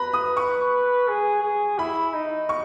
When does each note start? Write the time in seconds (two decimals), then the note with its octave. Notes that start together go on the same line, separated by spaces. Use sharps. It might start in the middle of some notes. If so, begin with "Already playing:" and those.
Already playing: B4 A#5 B5
0.13 D#6
0.37 C#6
1.08 G#4
1.43 G#4
1.79 E4 B5
2.14 D#4
2.49 C#6